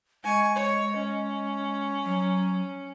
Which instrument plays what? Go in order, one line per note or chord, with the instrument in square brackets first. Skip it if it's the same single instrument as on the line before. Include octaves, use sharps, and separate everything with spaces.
[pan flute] G#3 [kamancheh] G#5 C#6
[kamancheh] C#5
C#4
[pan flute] F#3